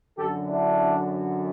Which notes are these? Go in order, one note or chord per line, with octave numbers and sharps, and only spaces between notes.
F#2 D3 F#3 G4 A4
D4 E4